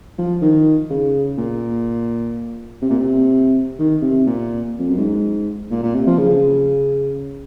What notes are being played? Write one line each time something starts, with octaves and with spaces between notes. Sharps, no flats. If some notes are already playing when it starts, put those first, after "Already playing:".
F3
D#3
C#3
A#2
C3
A#2
C3
D#3
C3
A#2
F2
F#2
G#2
A#2
A#2
C3
F3
C#3